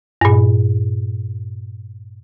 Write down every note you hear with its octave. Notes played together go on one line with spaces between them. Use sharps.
G2 A#2